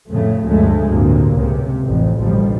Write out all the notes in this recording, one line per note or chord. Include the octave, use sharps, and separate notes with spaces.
F2 A2 C#3 A3
D2 G2 C#3 F3 G#3 A3
G1 D2 A2 C3 A#3
C#2 C3
A1 F2
A1 D2 B2 F3 G3